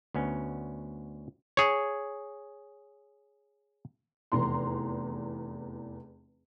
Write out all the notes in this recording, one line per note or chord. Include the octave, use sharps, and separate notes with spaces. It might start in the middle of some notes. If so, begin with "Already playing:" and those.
D2 B3 C#4
G#4 C#5
F1 E2 A#5 C6